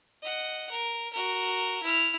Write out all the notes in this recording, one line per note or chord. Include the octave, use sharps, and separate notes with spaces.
D#5 F#5
A#4
F#4 A#4
E4 F6